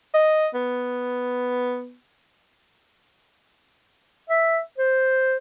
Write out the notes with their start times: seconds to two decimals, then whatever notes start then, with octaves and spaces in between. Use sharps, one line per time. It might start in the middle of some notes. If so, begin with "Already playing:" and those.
0.14 D#5
0.54 B3
4.29 E5
4.78 C5